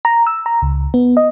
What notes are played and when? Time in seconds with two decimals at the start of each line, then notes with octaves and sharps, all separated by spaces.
0.05 A#5
0.27 E6
0.46 A#5
0.62 C#2
0.94 B3
1.17 D#5